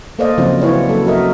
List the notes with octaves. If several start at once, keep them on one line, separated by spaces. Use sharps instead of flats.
A#3 A4 C5 D5 D#5 F5
C#3 F3 F#3 A#3 C4 F4
C#4 E4 F#4 B4 C#5 D5
F#3 A#3 A4
F#3 F#4 A#4 D#5 E5